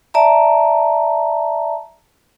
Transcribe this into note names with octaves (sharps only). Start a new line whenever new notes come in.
D5 E5 A5 A#5